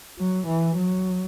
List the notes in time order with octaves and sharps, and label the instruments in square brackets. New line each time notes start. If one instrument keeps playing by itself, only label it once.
[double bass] F#3
E3
F#3